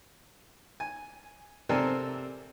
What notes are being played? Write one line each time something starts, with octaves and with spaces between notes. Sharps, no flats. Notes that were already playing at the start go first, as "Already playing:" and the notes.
G#5
C3 C4 A4 A#4 D5 G#5